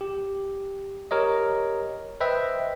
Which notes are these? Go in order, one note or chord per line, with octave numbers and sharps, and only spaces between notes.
G4
G4 A#4 C#5 D#5
B4 C5 D#5 E5 G5